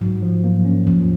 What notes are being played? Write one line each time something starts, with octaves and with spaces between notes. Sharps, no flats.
G#2 F#3
F3
A#3
C#4
D#2 F3